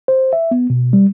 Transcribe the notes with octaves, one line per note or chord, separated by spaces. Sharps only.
C5
E5
B3
B2
G3